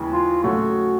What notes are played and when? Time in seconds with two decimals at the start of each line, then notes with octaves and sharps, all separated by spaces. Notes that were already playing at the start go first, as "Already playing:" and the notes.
Already playing: D#2 C#3 E3 G#3 B3
0.13 F4
0.44 C#3 F#3 A3 F#4